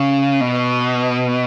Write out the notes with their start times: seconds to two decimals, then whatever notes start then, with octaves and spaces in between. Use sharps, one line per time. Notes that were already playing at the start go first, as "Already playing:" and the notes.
Already playing: C#3
0.41 B2